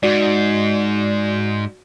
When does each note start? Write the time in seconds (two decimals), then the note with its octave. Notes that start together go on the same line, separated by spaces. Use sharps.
0.03 G#2 F#4 D5